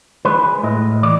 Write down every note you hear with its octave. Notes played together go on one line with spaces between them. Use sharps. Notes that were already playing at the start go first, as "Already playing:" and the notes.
G#3 B4
A2 D#5
E3 D5